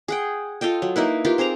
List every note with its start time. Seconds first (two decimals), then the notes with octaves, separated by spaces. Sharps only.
0.08 G#4 F#5 G5
0.61 F4 A4 D#5 G5
0.82 F#3
0.96 A#3 D#4 E4 B4
1.25 F4 G4 A#4 B4
1.38 C4 G#4 C5 A#5